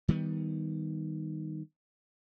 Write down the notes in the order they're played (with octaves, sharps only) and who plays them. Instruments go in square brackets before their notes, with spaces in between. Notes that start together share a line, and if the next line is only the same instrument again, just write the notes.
[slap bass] D#3 G3 B3